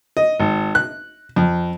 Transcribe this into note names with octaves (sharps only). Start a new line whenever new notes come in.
D#5
G#1
F#6
F2